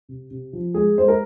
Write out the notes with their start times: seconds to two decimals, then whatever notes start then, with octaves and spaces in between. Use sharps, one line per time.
0.09 C3
0.31 C3
0.53 F3
0.74 G#3 G#4
0.98 G#3 C5
1.08 A#4